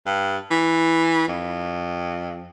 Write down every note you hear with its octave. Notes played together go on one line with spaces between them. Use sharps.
G2
E3
F2